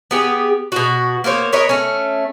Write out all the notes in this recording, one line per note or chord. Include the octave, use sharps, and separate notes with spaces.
B3 G4 G#4
B2 F#4
A#3 B3 C5 C#5
A#4 B4 C#5 D#5
A3 C#4